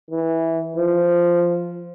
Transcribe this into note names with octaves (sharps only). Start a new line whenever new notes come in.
E3
F3